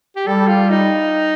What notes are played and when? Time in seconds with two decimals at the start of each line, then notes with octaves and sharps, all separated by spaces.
0.16 G4
0.27 G3 A4
0.48 F4
0.70 D#4